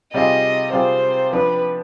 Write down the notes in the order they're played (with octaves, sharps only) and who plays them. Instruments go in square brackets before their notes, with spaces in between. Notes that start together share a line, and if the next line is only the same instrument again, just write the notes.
[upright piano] C3 G3 C4 F4 G#4 [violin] D#5
[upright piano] C3 G3 C4 F4 G#4 [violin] C5
[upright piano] F3 B3 D4 [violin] B4